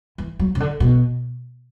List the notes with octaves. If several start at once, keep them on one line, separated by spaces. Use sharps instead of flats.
E3
F#3
C#3
D3
B2